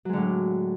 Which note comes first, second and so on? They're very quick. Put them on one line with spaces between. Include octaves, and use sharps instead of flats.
F#3 G#3 D3 A2